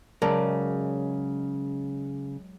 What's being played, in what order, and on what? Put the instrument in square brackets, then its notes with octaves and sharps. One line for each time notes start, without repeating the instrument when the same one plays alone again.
[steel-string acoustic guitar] C#3 [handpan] F#3 G#3 [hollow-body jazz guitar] A#4 D5 A5